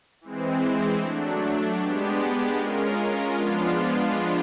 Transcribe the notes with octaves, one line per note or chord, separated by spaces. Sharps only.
E3 G#3 C4
F#3 A3 D4
G#3 B3 D4 G4
G#3 C#4 F4 A#4
F3 G#3 B3 D4 F4